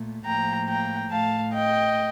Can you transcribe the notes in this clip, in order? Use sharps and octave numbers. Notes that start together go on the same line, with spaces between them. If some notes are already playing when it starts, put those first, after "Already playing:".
Already playing: A#2 A3
A2 F3 A#3 G5 A#5
G5 A#5
A2 A3 F5 A5
D#5 G5